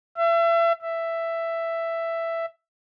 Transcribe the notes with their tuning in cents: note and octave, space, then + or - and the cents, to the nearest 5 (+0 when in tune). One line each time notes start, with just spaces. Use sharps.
E5 +35
E5 +10